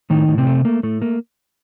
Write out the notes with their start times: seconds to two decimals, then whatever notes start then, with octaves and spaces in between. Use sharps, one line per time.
0.10 A2 D#3 D#4
0.28 A2
0.38 C3 C4
0.47 A3
0.65 A3 A#3
0.83 A2 A3
1.01 A3 A#3